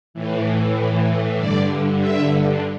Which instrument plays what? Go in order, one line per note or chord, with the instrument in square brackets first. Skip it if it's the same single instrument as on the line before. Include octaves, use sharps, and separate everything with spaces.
[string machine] A2 E3
G2 D3 D5
E5